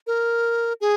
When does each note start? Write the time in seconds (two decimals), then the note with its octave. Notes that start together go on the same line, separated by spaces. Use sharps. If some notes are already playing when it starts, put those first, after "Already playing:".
0.07 A#4
0.81 G#4